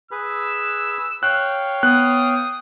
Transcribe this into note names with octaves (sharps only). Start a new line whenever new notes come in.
G#4 B4 E6
C#5 F5 G5 F#6
B3 D#6 F#6